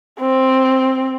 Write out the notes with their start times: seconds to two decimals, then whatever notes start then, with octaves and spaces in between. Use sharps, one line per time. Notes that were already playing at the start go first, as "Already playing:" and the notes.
0.20 C4